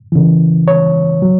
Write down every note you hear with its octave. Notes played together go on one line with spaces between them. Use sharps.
C#3 E3
C#5
F#3